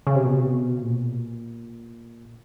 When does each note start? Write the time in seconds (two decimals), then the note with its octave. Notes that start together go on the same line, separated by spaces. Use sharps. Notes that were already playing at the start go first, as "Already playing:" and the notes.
0.07 C#3
0.15 C3
0.25 B2
0.34 C3
0.44 B2
0.82 A#2